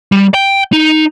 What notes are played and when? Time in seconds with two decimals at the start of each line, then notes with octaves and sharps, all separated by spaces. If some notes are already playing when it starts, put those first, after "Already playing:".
0.12 G3
0.34 G5
0.73 D#4